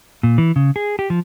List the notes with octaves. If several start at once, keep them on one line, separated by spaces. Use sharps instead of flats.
A#2
E3
C#3
G#4
G4
F3